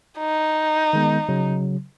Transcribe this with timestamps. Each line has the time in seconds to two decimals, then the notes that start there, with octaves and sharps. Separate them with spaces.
0.19 D#4
0.93 D#3 G#3 B3
1.29 C#3 F#3